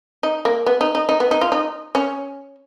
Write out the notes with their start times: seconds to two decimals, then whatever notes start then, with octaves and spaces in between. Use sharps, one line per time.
0.23 D#4
0.45 A#3
0.66 B3
0.81 D#4
0.95 D#4
1.09 D#4
1.20 B3
1.31 D#4
1.41 F4
1.52 D#4
1.95 C#4